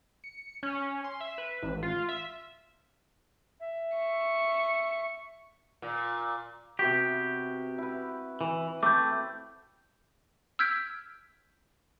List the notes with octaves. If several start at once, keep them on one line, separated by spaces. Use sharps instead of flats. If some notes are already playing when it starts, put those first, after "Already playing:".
C#7
C#4
C6
E5
B4
A1
F4
E5
E5
C#6
A#2
C3 B3 F#4 G4
E4 B4
E3
A3 C4 B4 D6 G6
E6 F6 G6 G#6 B6 D7